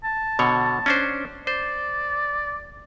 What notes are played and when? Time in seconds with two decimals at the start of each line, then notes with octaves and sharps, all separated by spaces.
0.04 A5
0.39 B2 D3 C#5
0.86 C#4 D4 C5
1.47 C5 D5